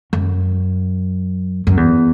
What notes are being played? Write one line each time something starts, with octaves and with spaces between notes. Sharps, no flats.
F#2
F#2
E2